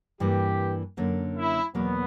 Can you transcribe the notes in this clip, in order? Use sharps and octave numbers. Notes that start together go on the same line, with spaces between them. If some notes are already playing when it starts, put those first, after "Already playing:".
G2 E3 A#3 G4
F#2 D3 A#3
E4
E2 B2 F#3 A#3 B3